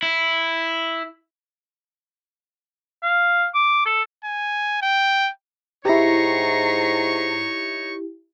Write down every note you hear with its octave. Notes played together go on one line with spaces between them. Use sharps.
E4
F5
D6
A4
G#5
G5
G#2 D#4 E4 G4 C#5 A#5 C#6 C7